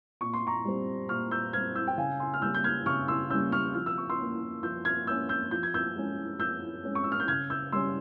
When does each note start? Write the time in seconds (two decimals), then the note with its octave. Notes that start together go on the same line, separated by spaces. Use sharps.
0.21 A#2 C#6
0.33 C6
0.47 A#5 C#6
0.65 G3 C4
1.09 A#2 C#6 F6
1.31 E6 G6
1.53 G3 C4 F6 G#6
1.75 E6 G6
1.87 G5
1.98 C#3 F5 G#5
2.20 G#5 C6
2.34 F6
2.42 G3 A#3 C#4 E6 G6
2.55 G6
2.64 F6 G#6
2.86 C#3 C#6 F6
3.08 C6 E6
3.30 G3 A#3 C#4 E6 G6
3.52 C#6 F6
3.74 F3 F6
3.86 E6
3.98 C#6
4.10 C6 E6
4.19 A#3 C#4
4.63 F3 E6 G6
4.85 F6 G#6
5.07 A#3 C#4 E6 G6
5.29 E6 G6
5.51 F3 G6
5.63 G#6
5.74 E6 G6
5.95 G#3 C#4
6.40 F3 E6 G6
6.84 G#3 C#4
6.95 C#6
7.04 E6
7.12 F6
7.20 G6
7.28 C#3 F6 G#6
7.50 E6 G6
7.72 G3 C#4 C6 E6